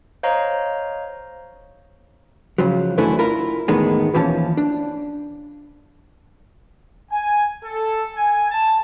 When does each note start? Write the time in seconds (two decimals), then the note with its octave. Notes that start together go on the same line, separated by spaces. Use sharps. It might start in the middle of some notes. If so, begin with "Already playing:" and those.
0.23 C5 C#5 D#5 F5 A#5
2.58 C#3 F3 F#3
2.98 F#2 D3 E3 A3 C#4 E4
3.19 E4 F4 A#4
3.68 E2 A2 D#3 G#3 B3
4.14 D#2 E3 F3 C#4 A5
4.57 D4
7.12 G#5
7.63 A4
8.17 G#5
8.51 A5